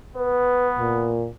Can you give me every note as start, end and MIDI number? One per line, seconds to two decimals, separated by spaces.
0.16 1.15 59
0.16 0.69 71
0.78 1.27 46